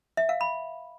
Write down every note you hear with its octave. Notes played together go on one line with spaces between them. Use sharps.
E5
F5
B5